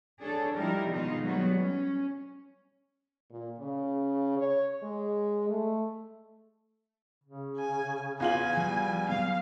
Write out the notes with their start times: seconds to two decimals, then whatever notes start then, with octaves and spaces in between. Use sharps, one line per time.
0.19 D4 G#4 A4 C#5
0.53 F3 G3 D#4 E4 G4 A#4
0.88 B2 D#3 G#3 B3 D#4 F4
1.23 F#3 G3 B3 C#5
1.55 C#4
3.30 A#2
3.60 C#3
4.37 C#5
4.83 G#3
5.49 A3
7.23 C#3
7.57 G#5
8.20 E2 F4 G#5 F#7
8.57 F3 G3
9.09 F#3 B3 F5